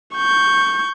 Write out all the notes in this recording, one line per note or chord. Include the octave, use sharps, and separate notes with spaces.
C#6 G6